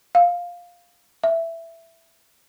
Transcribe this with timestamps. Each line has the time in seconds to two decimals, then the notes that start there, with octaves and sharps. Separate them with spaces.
0.15 F5
1.24 E5